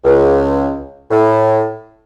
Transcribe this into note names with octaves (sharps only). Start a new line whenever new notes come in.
C#2
A2